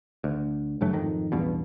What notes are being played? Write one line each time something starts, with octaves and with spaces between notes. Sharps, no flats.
D2
F#1 G2 F#3 A3
G#1 F2 D#3
A1 E2 G2 B2